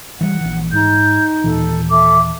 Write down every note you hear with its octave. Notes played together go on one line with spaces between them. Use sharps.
E3 G3 F#5
A#1 E3
G#2 D#4 G6
D#2 A#2 E3 A4
A4 E5 D6